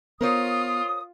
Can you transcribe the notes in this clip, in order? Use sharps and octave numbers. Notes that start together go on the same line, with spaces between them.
B3 F4 A#4 C5 C#5 D#6